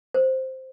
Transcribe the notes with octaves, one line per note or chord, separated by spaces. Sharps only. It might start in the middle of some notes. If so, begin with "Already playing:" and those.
C5